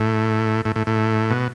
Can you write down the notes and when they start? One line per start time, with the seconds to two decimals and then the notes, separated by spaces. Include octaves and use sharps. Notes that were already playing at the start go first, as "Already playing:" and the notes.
Already playing: A2
0.65 A2
0.76 A2
0.87 A2
1.30 B2